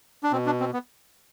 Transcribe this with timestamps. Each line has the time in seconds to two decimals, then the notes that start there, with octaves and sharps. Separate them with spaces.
0.23 D4
0.32 B2 C4
0.46 D4
0.60 C4
0.73 B3